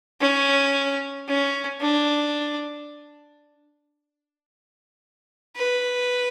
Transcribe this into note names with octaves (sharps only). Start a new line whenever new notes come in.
C#4
C#4
D4
B4